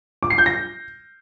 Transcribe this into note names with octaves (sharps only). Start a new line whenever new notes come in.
D6
C7
G6
A#6